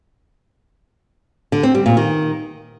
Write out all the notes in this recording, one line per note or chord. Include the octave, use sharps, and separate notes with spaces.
D3
C4
G3
A#2
D#3